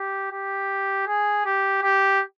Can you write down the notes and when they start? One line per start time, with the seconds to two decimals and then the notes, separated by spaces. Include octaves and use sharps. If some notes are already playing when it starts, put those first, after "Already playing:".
Already playing: G4
0.32 G4
1.07 G#4
1.45 G4
1.82 G4